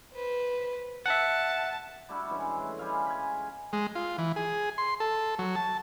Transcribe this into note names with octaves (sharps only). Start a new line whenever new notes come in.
B4 C5
E5 F#5 A5
G3 D4 E4 F#4
E3 G3 G#3 C#4
A3
G3 G#3 F5 G#5
G#5 B5
G#3
F4
E3
G#4
C6
A4
F#3
A5